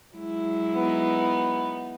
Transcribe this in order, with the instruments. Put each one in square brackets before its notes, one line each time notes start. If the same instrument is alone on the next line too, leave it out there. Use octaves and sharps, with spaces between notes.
[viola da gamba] F#3 G#3 E4
[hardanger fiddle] B3 D#4